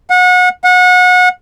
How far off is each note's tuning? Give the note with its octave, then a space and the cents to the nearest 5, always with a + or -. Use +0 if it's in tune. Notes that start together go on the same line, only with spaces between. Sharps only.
F#5 -30
F#5 -30